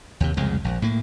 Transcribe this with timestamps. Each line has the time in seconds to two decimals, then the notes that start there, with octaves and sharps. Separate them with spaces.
0.20 D#2 C3
0.37 C2 F2 C#3 G#3
0.64 A#1
0.82 A2 A#3